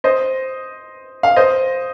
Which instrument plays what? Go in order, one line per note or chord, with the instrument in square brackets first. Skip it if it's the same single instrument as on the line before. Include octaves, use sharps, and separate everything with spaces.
[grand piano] C5 D#5
F5
C5 D#5